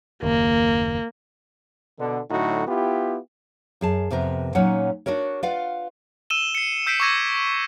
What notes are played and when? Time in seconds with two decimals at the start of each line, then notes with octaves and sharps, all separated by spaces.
0.23 F#1 D#2 A#3
2.00 B2 D3
2.30 A2 D3 F#3 D#4 F#4
2.68 B3 E4 F4 G4
3.81 F#2 G#4 A5
4.11 F2 C3 B3 A#4
4.55 A#2 F#3 C#4 D#4 C#5 F#5
5.06 D4 F#4 A#4 C#5
5.43 F4 B4 D5 F5 F#5
6.30 E6 D#7 E7 G7
6.55 C7 C#7
6.86 E6 G6 B6 C7 D7 D#7
7.00 C#6 D6 E6 G#6 A#6 D#7